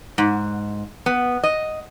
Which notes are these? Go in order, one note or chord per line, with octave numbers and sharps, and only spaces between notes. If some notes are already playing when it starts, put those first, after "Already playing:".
G#2
B3
D#5